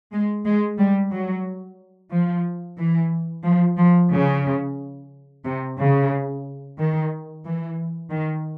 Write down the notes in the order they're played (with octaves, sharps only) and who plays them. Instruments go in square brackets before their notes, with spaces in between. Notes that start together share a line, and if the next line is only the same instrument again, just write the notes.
[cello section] G#3
G#3
G3
F#3
F3
E3
F3
F3
C#3
C3
C#3
D#3
E3
D#3